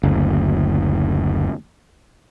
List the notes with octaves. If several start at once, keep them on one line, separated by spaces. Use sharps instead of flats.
F#1 D2